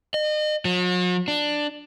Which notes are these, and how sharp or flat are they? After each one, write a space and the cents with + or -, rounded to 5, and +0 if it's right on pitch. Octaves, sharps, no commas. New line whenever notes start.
D#5 -35
F#3 -45
D4 +10